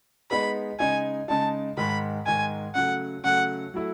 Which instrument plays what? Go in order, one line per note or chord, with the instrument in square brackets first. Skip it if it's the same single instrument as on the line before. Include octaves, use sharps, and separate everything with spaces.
[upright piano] G#3 B3 D#4 G#4 B4 [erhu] B5
[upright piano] C#3 G#3 D#4 [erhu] G#5
[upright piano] C#3 G#3 D#4 [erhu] A5
[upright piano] G#2 D#3 G#3 [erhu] B5
[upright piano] G#2 D#3 G#3 [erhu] G#5
[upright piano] C#3 F#3 A3 [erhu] F#5
[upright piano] C#3 F#3 A3 [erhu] F#5
[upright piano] F#3 A3 E4